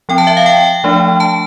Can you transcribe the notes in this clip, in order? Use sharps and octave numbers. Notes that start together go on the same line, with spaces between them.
F3 C4 G5
A5
E5
F5
G5
F3 A3 D4
A5